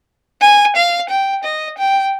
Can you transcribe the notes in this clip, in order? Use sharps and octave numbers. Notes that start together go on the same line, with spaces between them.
G#5
F5
G5
D#5
G5